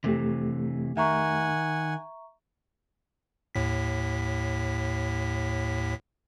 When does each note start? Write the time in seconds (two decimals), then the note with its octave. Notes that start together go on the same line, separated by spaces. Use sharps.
0.04 F2 C3 E3 A3 G4
0.97 D#3 E5 F#5 G#5 A#5 C#6
3.55 D#2 A2 B6